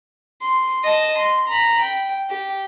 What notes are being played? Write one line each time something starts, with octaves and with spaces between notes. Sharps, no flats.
C6
D#5 A5
C6
A#5 B5
G5
G4